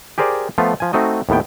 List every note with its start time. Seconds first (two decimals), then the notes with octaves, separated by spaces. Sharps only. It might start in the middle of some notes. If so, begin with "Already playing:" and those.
0.18 G4 G#4 A#4 C5 D5
0.58 F3 A3 B3 F4
0.80 F3 G#5
0.93 A3 C4 D#4 F#4 D#5
1.29 D#2 A2 B3 G5